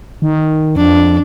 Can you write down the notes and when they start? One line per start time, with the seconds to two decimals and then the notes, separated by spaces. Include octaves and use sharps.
0.22 D#3
0.76 F2 D4